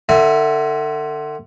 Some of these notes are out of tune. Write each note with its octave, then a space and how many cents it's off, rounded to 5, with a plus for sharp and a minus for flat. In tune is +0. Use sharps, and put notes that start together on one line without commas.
D3 +35 E5 +5 G#5 +30